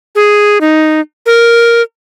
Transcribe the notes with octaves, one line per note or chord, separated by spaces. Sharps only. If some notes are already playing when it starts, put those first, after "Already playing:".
G#4
D#4
A#4